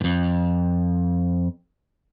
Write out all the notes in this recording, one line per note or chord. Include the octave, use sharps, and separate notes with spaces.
F2 G#2